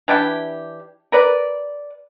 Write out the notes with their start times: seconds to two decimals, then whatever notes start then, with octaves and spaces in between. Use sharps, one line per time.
0.08 E3 D4 E4 G4
1.12 A#4 B4 D5